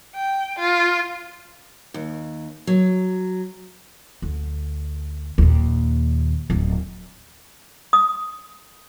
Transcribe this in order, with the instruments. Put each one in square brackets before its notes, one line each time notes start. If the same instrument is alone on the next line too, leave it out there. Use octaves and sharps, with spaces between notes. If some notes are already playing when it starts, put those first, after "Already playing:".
[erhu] G5
F4
[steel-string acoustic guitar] D#2
F#3
[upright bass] D2
D#2 A#2
D1
[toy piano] D#6